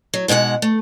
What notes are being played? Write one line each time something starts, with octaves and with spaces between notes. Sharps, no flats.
F#3
G#2 B2 G#3 G4 F#5
A3